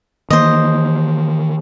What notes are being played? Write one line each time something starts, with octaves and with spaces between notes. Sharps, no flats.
D#3 E3 A#3 C5 D#5